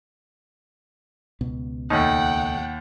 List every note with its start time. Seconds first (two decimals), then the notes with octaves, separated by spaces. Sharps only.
1.41 C#2 B2 B3
1.90 D#2 A3 C#4 D#4 F#5 G5